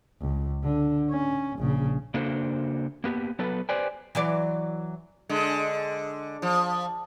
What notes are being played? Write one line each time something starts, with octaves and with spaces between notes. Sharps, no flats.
C#2
D3
C#4
A#1 C#3
C#3 A#3 D4 F#4 A4 C5
A#3 B3 G4
F#3 B3 A4 B4
G4 B4 C5 D5 G5 G#5
E3 F#3 D5
D3 G#3
F3